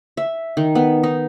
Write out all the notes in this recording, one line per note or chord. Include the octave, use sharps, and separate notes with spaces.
E5
D#3
B3
D#4